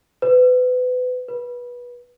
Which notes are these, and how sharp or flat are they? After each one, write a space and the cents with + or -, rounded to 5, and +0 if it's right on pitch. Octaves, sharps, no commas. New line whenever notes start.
B4 +30
B4 -20